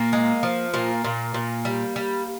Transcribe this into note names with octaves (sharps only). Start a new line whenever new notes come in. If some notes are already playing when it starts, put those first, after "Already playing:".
Already playing: A#2 A#3
G#3
F3
A#2 A#3
A#2
A#2
G3
G3